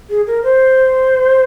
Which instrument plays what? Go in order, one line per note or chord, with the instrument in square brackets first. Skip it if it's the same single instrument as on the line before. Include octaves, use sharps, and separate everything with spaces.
[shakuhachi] G#4
A#4
C5